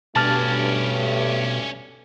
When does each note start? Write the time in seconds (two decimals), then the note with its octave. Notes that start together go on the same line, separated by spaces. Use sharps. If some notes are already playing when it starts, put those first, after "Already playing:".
0.16 G2 B2 A3 C#4 D5 A5 F6 A6